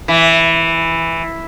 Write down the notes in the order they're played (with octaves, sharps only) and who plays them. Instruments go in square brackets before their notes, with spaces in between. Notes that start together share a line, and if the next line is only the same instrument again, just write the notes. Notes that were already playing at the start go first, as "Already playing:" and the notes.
[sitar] E3